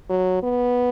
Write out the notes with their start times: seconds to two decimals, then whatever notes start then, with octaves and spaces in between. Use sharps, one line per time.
0.10 F#3
0.43 B3